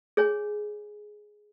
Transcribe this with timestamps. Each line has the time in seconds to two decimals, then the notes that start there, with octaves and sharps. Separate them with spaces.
0.17 G#4 C#5 G#5